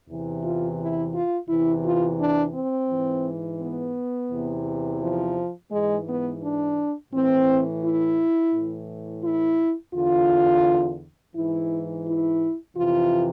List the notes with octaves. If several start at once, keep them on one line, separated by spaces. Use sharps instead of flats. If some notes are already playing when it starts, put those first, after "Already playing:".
E2 C3 E3
F4
E4
F4
E2 C3 E3 E4
F4
D4
C4
G#2 E3
B3
E2 C3 E3
F3
G#2 E3 G#3
B3
D4
A2 E3 C4
E4
A2 E3
E4
E2 D3 F4
G#2 E3 E4
E4
F2 C3 E3 F4